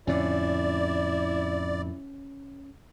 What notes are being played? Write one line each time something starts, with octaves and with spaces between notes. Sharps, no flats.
F2 A2 D3 C#4 E4 D5